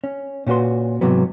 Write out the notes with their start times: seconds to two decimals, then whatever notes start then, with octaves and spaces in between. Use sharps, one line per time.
0.04 C#4
0.47 A#2 C#4 F#4 B4 C6
1.01 G#2 C3 E3 F#3 B3